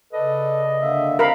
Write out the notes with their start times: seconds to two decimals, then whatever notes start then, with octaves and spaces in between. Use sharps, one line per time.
0.13 C#3 A4 B4 D5 D#5
0.80 D3 A#3 E5
1.19 C4 A#4 F5 A#5 B5